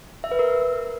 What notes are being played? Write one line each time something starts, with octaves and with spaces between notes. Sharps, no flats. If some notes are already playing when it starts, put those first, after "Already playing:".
E5
B4
A#4